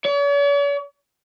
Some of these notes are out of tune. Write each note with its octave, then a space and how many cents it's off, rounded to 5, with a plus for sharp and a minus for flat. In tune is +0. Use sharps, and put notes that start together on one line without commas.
C#5 +45